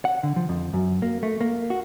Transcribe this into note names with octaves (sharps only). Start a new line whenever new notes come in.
F#5
D3
F3
F2
F#2
A#3
A3
A#3
F#4